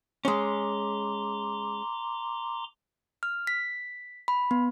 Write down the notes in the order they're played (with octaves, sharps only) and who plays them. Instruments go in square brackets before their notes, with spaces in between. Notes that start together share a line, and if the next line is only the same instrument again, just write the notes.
[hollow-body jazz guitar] G#3 C#4 [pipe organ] A#5 C6 D6
[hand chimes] F6
B6
B5
B3